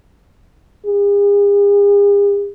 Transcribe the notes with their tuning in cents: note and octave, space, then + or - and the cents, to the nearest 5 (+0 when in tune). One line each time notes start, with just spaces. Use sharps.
G#4 -45